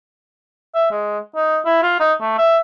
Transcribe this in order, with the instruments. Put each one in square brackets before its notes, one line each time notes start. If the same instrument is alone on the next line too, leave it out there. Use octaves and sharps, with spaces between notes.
[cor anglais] E5
G#3
D#4
E4
F4
D#4
A3
E5